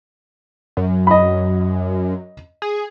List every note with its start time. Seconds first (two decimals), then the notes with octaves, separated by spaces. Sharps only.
0.77 F#2
1.07 D#5 B5
2.62 G#4